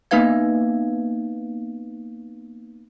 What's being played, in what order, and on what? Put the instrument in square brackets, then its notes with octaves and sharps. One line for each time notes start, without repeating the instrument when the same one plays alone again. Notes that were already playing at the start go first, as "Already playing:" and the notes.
[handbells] A#3 B3 D#4 B4 F5 G#6